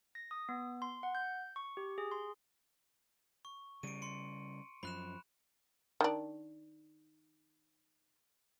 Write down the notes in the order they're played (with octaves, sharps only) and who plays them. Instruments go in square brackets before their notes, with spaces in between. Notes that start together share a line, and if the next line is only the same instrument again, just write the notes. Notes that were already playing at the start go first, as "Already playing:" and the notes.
[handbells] A#6
D#6
B3
C6
F#5
G6
C#6
G4
G#4
C6
[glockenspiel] C#6
[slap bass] C#3 G3 [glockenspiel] D7 D#7
[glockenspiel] C6 C#7
[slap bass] F#2 F3 [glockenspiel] B5 F#6 E7
[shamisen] D#3 D4